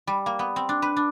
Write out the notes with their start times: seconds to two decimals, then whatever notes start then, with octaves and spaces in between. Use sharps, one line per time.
0.07 G3
0.26 A#3
0.39 B3
0.56 C4
0.69 D4
0.82 B4
0.96 D4